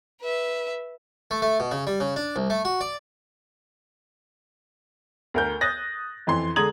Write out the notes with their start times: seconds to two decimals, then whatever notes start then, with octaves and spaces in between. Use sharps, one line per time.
0.21 B4 E5
1.31 A3
1.42 A3
1.60 B2
1.71 C#3
1.87 G3
2.00 C#3
2.16 D4
2.36 C2
2.50 A3
2.65 F#4
2.81 D5
5.34 D2 A#4 G6
5.61 D#6 F#6 A6 A#6
6.27 F2 E3 C6
6.56 D3 G#3 A#5 D#6 G#6 F#7